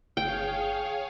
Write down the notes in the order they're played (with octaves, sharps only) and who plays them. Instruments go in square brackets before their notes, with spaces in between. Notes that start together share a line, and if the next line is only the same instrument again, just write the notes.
[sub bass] G1 [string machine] G#4 C#5 F5 [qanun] G5